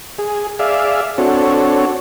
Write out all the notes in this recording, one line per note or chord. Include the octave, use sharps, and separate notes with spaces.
G#4
G#4 D5 E5 F5
C4 D4 F#4 A4 C#5